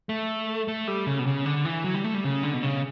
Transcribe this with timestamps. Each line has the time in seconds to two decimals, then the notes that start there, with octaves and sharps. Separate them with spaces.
0.09 A3
0.68 A3
0.88 G3
1.06 C#3
1.19 B2
1.27 C#3
1.46 D3
1.65 E3
1.84 F#3
1.94 G3
2.04 A3
2.14 G3
2.24 C#3
2.43 D3
2.54 B2
2.63 C#3